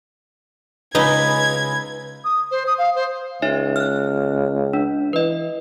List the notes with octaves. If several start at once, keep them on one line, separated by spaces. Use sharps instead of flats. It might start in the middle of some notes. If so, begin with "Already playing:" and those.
C#2 G#3 D#4 B4 B5 G#6
D#6
C5
D#6
F5
C5
C#2 D#4 C#5 E5
F6 F#6
D4
E3 B4 D#5